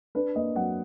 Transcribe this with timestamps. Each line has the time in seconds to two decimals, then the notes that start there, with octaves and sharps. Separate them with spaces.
0.15 D4 B4
0.35 A#3 D#5
0.56 F#3 F#5